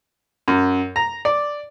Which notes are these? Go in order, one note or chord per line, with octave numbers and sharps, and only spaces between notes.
F#2
A#5
D5